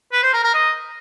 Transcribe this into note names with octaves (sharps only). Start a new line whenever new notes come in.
B4
C5
A#4
A#4
D#5